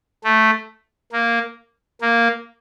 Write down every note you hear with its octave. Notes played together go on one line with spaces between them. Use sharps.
A3
A#3
A#3